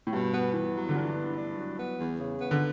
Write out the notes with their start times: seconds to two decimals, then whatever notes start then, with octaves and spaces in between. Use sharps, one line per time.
0.07 A2
0.13 G2 B2
0.33 B3
0.54 E3 B3
0.74 F#3
0.89 D3
0.96 E3 D4
1.16 B3
1.36 D4
1.58 F#3
1.78 B3
1.98 E2
2.19 C#3
2.40 B3
2.51 D3